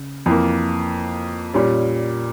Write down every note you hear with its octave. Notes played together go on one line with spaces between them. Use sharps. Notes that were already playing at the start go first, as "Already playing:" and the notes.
Already playing: C#3
F2 E3 A#3
A#2 G3 C#4